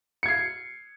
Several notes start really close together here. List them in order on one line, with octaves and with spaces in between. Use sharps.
C#7 G#6 C7